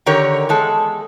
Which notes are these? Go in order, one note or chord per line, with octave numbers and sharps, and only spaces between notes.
D3 D#3 G4 A#4 C#5
E2 G#3 A4